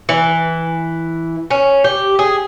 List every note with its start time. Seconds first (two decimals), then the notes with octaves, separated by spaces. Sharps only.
0.09 E3
1.50 C#4
1.84 G4
2.19 G#4